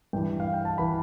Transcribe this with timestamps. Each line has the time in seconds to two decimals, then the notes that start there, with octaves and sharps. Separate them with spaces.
0.13 G2 E3 G5
0.40 F5
0.53 G5
0.65 A5
0.78 E3 B5